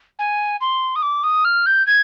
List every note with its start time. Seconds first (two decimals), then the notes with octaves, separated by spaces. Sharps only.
0.19 G#5
0.61 C6
0.96 D#6
1.02 D6
1.23 D#6
1.45 F6
1.66 G6
1.87 G#6